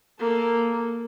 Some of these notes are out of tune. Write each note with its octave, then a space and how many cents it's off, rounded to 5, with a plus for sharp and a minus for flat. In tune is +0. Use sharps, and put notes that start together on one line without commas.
A#3 +0 A4 +0